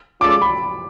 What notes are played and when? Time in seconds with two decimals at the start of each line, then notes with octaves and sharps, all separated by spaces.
0.21 G#3 C#4 F4 A4 D5 D6
0.42 B5